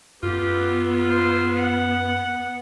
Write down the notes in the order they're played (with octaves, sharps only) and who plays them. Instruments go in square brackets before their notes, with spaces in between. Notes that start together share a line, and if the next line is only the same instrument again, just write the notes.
[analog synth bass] F#2 [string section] B3 [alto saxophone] F4 [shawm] G4
[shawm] C5
F#5